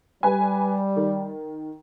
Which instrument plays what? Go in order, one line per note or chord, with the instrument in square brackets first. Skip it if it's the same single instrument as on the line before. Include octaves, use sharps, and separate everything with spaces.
[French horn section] G3 [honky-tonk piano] B4 G#5
[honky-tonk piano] D#3